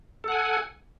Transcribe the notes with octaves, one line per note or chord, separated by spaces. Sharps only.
A4 F#5 G#5